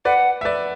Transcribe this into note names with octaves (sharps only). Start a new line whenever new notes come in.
B4 D5 F#5
E5
B4 D5